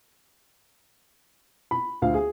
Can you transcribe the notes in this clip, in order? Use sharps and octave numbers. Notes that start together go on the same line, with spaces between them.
B5
D2 F4 F5
G#4